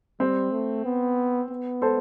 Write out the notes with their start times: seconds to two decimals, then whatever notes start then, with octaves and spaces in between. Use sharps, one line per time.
0.20 G3 C4
0.52 A3
0.85 B3
1.50 B3
1.82 A4 C5